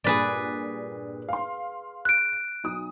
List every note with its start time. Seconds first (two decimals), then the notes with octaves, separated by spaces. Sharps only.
0.04 G2 A#2 G#4 B4 D5
1.29 F5 C6
2.05 F#6 D7
2.64 B1 D#6